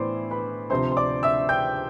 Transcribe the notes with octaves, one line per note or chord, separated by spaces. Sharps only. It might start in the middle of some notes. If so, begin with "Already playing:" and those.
Already playing: A2 E3 B3 E4 C5 D5 C6 D6
B4 B5
D2 C3 F3 C5 C6
C6
D5 D6
E5 E6
G5 G6